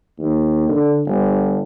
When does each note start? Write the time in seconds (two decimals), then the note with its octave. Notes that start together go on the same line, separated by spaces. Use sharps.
0.19 D#2
0.68 D3
1.06 G1